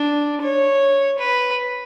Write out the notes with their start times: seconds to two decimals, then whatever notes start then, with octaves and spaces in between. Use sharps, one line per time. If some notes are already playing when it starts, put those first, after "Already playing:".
Already playing: D4
0.42 C#5
1.18 B4